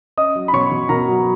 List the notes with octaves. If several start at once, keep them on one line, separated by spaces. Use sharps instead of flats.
C#4 D#5 D#6
F#3
B5
B2 C#5 C#6
B2
B2 A#4 A#5
F#3